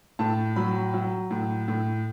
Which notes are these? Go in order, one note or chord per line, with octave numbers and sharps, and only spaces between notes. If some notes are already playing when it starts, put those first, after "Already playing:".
A2 A5
F#3 B5
F#3
A2
A2